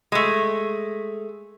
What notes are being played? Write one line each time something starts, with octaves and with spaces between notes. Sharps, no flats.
G#3 A3